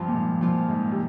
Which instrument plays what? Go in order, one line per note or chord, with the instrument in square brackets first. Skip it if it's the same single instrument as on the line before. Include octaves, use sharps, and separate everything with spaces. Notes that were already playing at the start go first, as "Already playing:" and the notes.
Already playing: [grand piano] G2 [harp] F3 C4 F4
[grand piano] A#2
G#2
[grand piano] A#2 [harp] F3 C4 F4
[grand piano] G#2
C3